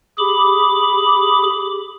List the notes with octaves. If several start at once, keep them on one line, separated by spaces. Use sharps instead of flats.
G4 G#4 B5 D6